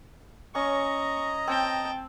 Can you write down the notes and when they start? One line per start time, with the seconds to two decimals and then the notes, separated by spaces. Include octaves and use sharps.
0.55 C#4 D#5 A#5 C#6
1.47 C4 G5 A5